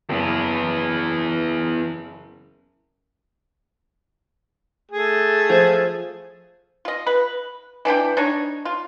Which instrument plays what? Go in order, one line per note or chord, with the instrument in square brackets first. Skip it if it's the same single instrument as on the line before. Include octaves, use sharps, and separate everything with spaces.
[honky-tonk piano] F#1 [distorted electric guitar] E2 B3
[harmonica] A3 G#4
[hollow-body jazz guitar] F3
[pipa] F4 D#5
B4
E3 D4 E4 G5
D4 D#4 C#5
F4